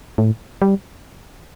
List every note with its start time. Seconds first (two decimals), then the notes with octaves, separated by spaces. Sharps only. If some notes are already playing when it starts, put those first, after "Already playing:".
0.18 A2
0.62 G3